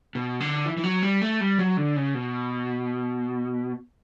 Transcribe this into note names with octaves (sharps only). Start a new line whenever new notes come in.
B2
D3
E3
E3
F#3
G3
A3
G3
F#3
D3
C#3
B2